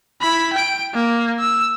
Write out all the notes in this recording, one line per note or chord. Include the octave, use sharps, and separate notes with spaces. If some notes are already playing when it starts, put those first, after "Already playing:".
E4 B5
G5 D7
A#3
E6